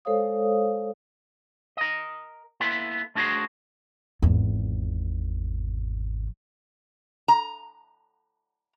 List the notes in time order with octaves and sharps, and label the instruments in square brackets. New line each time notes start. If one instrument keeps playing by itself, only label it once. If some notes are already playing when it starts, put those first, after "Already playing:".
[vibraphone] G#3 A4 C5 C#5 F5 D#6
[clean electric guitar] A#4 D#5
A#3 B3 E4 A4 E5 C6
A3 D4 F#4 G#4 A#4 C5
[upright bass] G#1 E2
[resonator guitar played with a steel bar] A#5